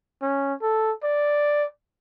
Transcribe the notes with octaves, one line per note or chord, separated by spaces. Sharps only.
C#4
A4
D5